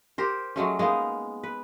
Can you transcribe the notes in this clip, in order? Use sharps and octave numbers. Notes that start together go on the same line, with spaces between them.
G4 A#4 C5
F#3 G#3 A3 C#4
G#3 A#3 B3 D#4
B4